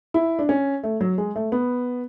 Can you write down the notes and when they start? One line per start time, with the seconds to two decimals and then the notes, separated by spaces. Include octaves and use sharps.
0.14 E4
0.39 D4
0.49 C#4
0.83 A3
1.01 F#3
1.18 G#3
1.36 A3
1.52 B3